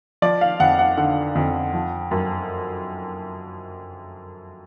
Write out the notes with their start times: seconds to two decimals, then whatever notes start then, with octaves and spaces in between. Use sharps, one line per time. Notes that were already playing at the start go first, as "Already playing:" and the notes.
0.22 F3 D5
0.41 F5
0.60 F2 F#5
0.79 F#5
0.97 D3 F#5
1.35 F2
1.73 F3
2.11 F#2